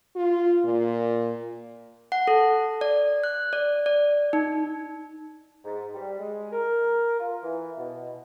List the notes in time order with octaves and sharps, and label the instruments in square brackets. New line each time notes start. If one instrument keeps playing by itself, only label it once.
[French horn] F4
A#2
[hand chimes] F#5
A4
D5
F#6
D5
D5
D#4
[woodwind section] G#2
G3
G#3
A#4
F4
E3
B2